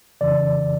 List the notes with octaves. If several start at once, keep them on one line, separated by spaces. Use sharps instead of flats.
F2 C#3 E3 D5